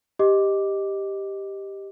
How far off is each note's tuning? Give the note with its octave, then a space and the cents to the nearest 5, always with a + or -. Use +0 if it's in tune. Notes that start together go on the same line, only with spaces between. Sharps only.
G4 +0 D#5 +0 D6 +0